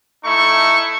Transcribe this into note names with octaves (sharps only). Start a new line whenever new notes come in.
A3 D#4 E4 C#6